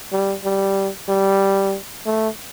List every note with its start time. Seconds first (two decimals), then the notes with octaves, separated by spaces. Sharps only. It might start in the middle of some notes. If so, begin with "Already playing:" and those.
0.12 G3
0.44 G3
1.08 G3
2.06 A3